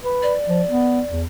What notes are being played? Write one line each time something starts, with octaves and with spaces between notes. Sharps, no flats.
B4
D5
F3
B3
E2